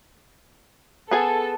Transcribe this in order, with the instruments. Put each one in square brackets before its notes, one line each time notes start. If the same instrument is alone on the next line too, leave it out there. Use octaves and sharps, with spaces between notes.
[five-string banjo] B3 G#4 G#5 [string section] A4